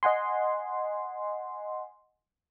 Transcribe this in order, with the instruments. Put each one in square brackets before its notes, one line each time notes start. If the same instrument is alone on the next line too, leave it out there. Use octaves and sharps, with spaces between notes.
[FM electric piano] D#5 F#5 G#5 C6